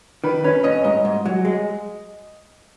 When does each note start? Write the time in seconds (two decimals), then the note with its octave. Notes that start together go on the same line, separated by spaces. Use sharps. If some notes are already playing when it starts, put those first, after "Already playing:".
0.24 D#3 B4
0.44 C#4 B4
0.64 C#4 D#5
0.84 G#2 D#5
1.05 G#2
1.26 F#3
1.45 G#3